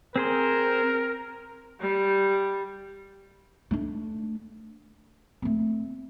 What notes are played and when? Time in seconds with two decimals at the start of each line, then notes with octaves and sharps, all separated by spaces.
0.16 C4 G#4 A#4 C5
1.81 G3
3.71 A3 D4
5.42 A3 C4